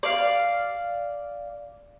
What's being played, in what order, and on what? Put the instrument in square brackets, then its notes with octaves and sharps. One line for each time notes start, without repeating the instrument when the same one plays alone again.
[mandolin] D5 F5